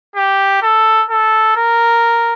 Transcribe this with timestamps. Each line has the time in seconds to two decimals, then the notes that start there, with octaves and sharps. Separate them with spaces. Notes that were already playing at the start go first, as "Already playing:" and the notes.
0.16 G4
0.62 A4
1.09 A4
1.56 A#4